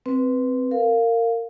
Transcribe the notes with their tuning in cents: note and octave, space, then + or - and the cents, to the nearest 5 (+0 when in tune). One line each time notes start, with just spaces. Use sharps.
C4 -5 B4 +0
A#4 -25 F5 +0